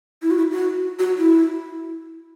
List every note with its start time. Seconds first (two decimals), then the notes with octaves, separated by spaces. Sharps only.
0.23 E4
0.31 F#4
0.38 E4
0.52 F#4
0.99 F#4
1.18 E4